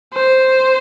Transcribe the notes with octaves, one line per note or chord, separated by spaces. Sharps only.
C5